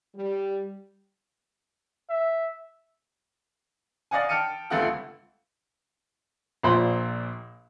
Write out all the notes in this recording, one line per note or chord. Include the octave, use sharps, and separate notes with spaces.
G3
E5
D5 D#5 F5 F#5 G#5
G5 A5 F6 C#7 D#7
G1 C#2 A3 C4 F4 F#5
A#1 A#2 C5 B5 C6